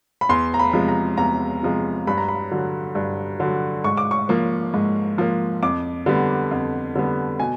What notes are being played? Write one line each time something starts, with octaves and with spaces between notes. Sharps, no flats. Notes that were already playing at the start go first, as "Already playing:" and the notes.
B5
E2 C6
A#5
B5
C3 F3 G#3
A#5
E2 A#5
C3 F3 G#3
G2 B5
A#5
B5
D3 F#3
G2
D3 F#3
G#2 C#6
D6
C#6
F3 A#3
G#2
F3 A#3
F2 D6
D3 G3 B3
F2
D3 G3 B3
B2 G#5